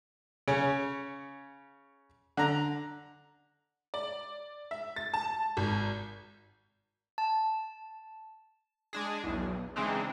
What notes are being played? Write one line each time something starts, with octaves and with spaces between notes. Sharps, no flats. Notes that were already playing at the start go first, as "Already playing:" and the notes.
C#3 C#4
D3 A#5
D5
E5
A6
A5
G#1
A5
G#3 D4 G#4
B1 E2
C#3 E3 G#3 C4 D4 D#4